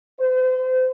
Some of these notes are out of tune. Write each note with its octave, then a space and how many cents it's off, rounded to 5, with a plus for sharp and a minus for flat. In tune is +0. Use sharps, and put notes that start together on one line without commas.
C5 -35